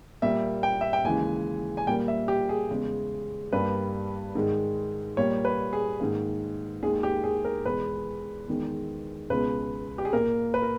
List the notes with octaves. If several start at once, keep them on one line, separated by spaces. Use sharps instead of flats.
A#2 G3 A#3 E5
G5
E5
G5
D#2 C#3 E3 G#3 G#5
G#5
A#2 G3 A#3 G5
E5
G4
G#4
E2 C#3 G#3
G2 G3 A#3 B4
G#2 D#3 G#3
A#2 G3 A#3 C#5
B4
G#4
G#2 D#3 A#3
D#2 D#3 G#3 G#4
G4
G#4
A#4
E2 B2 G#3 B4
E2 D#3 G#3
C#2 B2 G#3 B4
G4
G#4
A#2 A#3 A#4
B4
A#4